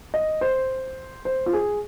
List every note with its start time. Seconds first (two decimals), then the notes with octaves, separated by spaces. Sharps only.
0.14 D#5
0.41 C5
1.25 C5
1.46 F4
1.53 G#4